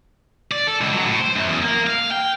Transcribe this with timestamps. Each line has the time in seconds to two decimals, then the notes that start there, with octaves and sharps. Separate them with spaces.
0.52 D5
0.67 A4
0.81 C#2
0.93 F#3
1.06 A2
1.20 C5
1.36 F#2
1.49 E2
1.62 A#3
1.87 F5
2.12 G5